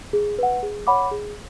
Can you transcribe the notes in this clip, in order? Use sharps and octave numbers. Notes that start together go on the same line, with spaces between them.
G#4
B4 F#5
G#4
C#5 F#5 B5 D6
G#4